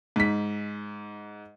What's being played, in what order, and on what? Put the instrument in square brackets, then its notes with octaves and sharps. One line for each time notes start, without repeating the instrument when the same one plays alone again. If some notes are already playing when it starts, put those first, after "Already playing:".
[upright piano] G#2 B6